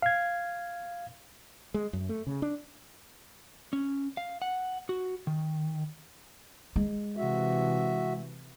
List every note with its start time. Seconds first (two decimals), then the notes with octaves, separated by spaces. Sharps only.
0.02 F5 G#6
1.74 G#3
1.93 F#2
2.09 A3
2.27 C#3
2.42 D4
3.73 C#4
4.17 F5
4.42 F#5
4.89 F#4
5.27 D#3
6.76 G#3
7.17 C3 E3 F#4 E5